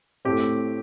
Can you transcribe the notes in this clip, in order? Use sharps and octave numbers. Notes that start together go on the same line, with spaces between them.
A2 A3 C4 G4